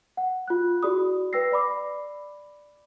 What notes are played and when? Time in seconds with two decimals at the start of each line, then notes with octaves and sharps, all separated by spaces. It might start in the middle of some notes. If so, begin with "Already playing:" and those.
0.17 F#5
0.48 F4 F#6
0.83 E4 F#4 G#4 D5 B5 D#6
1.33 B4 G5 E6 A#6 C7
1.52 D5 B5 D6